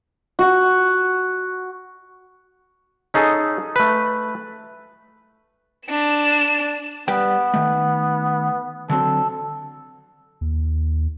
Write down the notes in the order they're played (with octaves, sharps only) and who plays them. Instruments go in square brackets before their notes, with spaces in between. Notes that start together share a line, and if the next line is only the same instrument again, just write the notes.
[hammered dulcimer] F#4
[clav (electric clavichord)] C#4 D#4 G#4 A4
A3 B4
[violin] D4 E7
[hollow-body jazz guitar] G3 B4 G5 [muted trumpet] B3
[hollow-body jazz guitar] D#3 A3
[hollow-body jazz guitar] D3 F#3 C4 [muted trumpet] A4
[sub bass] D#2